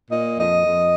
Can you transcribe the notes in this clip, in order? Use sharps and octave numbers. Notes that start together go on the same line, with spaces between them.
A#2 D#5
F2 D#5
F2